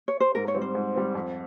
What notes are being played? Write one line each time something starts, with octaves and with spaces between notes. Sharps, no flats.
C#5
C5
G#2 A#4
C#5
G3 C4
C5
G#2
G3 C4
F2